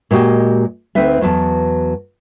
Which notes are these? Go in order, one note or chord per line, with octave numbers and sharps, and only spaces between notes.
A#2 G#3 F#4 G4 D#5
D2 C4 D#4 B4 E5
E2 F#3 B3 A5